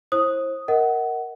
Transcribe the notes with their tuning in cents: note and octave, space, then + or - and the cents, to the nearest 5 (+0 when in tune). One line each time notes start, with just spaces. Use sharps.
E4 +0 C5 +35 D#6 +0
A#4 +0 D#5 +30 F#5 +15